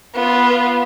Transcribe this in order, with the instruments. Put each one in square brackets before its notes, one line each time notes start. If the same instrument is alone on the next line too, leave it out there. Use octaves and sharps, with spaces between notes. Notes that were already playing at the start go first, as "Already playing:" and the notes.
[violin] B3 F4